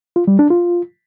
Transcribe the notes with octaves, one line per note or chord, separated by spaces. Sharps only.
F4
G3
D4
F4